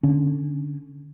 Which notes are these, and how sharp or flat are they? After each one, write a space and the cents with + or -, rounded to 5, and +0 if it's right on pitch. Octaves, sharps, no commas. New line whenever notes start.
D3 +0 C#4 +0